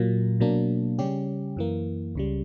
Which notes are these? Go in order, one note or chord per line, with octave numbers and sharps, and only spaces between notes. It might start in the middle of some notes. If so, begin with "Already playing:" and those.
Already playing: A#2 F#3 A#3
B2 F#3 A#3 D4
C#3 G3 C#4 G4
F#2 E3 A#3
C#2 C#3 G3